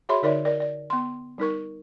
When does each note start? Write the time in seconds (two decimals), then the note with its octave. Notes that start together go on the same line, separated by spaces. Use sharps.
0.09 F#4 G#4 C#5 E5 B5 C6
0.23 D3 D#4 A#4 C#5 D5 E5
0.45 A#4 D5 D#5
0.60 D5
0.90 B3 C6
1.38 G3 D#4 A#4 C#6